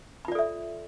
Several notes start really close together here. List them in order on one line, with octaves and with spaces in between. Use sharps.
B5 F4 D5 A4 E5